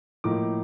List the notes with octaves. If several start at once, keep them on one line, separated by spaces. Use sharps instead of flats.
A2 F3 A#3 D#4 D6